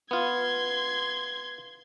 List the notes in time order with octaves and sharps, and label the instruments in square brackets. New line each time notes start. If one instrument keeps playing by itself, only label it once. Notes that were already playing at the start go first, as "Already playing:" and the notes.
[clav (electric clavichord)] B3 F4 [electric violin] C6 G#6